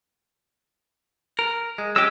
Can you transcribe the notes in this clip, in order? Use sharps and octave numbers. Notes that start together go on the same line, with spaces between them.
A#4
G#3
G#3 C#4 G4 E6